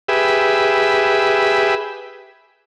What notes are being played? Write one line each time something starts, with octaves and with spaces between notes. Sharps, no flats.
G4 G#4 B4 E5